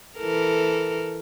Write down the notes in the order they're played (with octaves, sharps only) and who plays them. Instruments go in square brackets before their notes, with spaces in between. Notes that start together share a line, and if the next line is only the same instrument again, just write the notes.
[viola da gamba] E3 A4 A#4